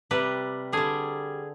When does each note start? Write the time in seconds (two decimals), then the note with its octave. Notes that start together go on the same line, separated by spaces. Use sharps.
0.11 C3 G3 B4
0.73 D3 G3 G#4